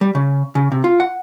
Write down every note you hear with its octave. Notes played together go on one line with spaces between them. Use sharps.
G3
C#3
C#3
C3
F4
F#5